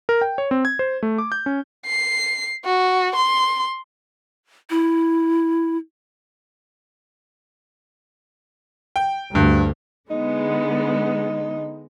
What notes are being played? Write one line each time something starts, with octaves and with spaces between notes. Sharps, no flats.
A#4
G5
C#5
C4
G#6
C5
A3
D6
G6
C#4
C7
F#4
C6
E4
G5
D2 G2
D3 G#3 B3 D#4